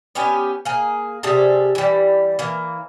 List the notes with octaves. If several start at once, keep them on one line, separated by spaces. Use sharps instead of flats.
B3 C#4 G4 G#5
A#3 G#4
C3 G3 G#4 A4
E3 G3
E3 A#3